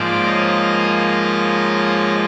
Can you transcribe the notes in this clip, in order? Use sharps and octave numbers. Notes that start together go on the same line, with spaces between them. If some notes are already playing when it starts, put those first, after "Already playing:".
Already playing: G#2 F3 A#3 C5 D5
C#5 D#5